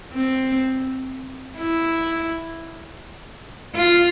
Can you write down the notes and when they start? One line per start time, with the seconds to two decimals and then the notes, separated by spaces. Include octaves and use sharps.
0.13 C4
1.58 E4
3.76 F4